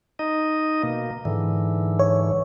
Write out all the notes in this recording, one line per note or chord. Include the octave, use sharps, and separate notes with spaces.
D#4 D#5
B2 A#3
G#2 D3 E3
C#5